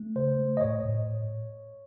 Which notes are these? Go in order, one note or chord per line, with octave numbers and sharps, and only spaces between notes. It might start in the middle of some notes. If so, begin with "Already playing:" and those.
Already playing: A3
C#3 C5
A3
D#5
A2 C#5
A2